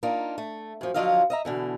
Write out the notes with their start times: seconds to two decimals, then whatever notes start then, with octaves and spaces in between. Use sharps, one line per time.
0.03 A#3 D4 D#4 F4
0.38 A3
0.81 F#2 F3
0.94 D3 F3 F#3 F4 D#5 F5
1.30 D#5 E5 A#5
1.45 B2 D3 E3